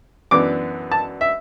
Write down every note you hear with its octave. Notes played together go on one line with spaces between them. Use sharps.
F#2 E3 B3 D4 D6
A5
E5